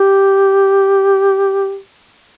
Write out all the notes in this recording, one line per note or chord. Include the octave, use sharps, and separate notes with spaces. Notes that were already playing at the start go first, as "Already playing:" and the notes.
Already playing: G4